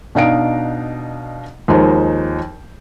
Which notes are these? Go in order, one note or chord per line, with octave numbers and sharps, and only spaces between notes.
B2 D4 D#4 F5 A#5 D7
D#2 F3 G#3 D#4 C5